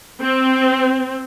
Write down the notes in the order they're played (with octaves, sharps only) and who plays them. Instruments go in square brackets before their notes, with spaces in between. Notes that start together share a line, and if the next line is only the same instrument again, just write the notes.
[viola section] C4